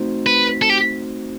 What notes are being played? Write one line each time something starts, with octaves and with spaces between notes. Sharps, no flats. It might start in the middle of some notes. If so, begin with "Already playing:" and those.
Already playing: A3 C4 D#4 F#4 C5
B4
A4
G4